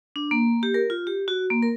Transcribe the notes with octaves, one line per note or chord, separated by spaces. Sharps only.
D4
A#3
G4
A#4
F4
G4
F#4
A#3
A#4